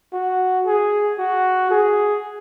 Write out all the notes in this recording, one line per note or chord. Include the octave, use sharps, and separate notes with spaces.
F#4
G#4
F#4
G#4